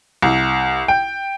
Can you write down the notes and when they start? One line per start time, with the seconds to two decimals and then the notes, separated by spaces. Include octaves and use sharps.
0.22 C2
0.88 G5